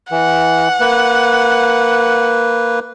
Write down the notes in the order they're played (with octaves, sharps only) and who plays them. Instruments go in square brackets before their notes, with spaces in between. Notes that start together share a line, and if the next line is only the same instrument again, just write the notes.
[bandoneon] E3 [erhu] F#5
[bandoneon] A#3 B4